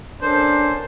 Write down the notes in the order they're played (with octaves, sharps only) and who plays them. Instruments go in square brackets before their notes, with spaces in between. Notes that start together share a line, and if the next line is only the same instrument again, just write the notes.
[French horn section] D#2 C#4 A#4 [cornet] D4 [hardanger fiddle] A4 [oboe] C5